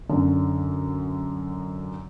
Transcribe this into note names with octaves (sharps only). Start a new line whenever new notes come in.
F#2 D3